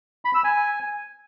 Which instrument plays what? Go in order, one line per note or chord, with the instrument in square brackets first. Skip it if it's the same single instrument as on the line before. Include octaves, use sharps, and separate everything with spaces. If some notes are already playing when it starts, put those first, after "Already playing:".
[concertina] B5
E6
G#5